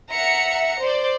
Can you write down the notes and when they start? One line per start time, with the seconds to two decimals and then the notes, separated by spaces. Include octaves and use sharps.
0.11 E5 F#5 A#5 C#7
0.79 C5 D5